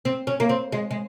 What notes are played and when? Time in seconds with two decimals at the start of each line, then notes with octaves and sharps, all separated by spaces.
0.05 C4
0.27 C#4
0.40 A#3
0.49 C4
0.72 G#3
0.91 G#3